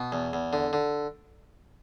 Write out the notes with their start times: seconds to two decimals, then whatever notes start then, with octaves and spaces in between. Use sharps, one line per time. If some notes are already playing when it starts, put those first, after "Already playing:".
Already playing: B2
0.12 E2
0.33 E2
0.53 D3
0.73 D3